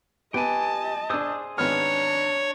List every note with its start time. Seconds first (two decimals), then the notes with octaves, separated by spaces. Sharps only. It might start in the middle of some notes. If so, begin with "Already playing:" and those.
0.34 B3 G4 D#5 G#5 A5
1.10 D4 G#4 C5 D#6 E6
1.58 G#1 B3 D4 C#5 A#5 F6